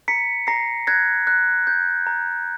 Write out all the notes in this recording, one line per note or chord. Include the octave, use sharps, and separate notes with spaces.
A#5 B6 C#7
A#5 A#6 C7
F#6 G#6 A#6
F#6
G6
A#5